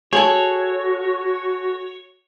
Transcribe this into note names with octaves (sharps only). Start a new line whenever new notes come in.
F#4 G#4 A4 C#5